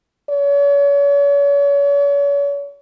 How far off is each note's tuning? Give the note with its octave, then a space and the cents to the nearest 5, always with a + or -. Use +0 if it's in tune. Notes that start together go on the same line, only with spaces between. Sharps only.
C#5 +40